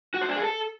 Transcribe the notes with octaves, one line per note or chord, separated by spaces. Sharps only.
F#4
C5
D4
G#4
A4